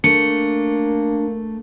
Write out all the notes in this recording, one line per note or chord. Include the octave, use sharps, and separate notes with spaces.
A3 A#3 D4 C#7